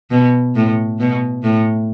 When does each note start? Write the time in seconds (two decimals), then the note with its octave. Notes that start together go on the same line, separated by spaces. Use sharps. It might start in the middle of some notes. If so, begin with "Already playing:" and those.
0.11 B2
0.56 A2
0.99 B2
1.43 A2